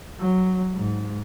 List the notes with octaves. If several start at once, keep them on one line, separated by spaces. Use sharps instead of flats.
F#3
G#2